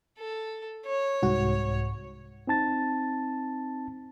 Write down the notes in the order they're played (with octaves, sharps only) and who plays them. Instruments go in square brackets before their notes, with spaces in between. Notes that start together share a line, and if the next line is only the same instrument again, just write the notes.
[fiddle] A4
C#5
[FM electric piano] C2 G#2 F#4
[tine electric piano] C4 D#4 A5 A6